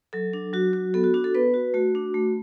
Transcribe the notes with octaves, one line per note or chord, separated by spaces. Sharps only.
F#3 A4
D4
F#3 F#4
F#4
B3 A4
F#4
D4 F#4
A4
B3 B4
F#4
A3 F#4
D4
A3